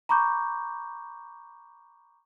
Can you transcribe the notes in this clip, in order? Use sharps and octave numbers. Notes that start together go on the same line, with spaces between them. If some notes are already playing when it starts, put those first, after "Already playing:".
A#5 B5 C#6 D6 G6